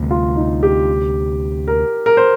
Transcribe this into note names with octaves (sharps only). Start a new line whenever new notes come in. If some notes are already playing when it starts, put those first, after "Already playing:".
Already playing: D2 C3 G3
F4
D#4
G4
A#4
A#4
C5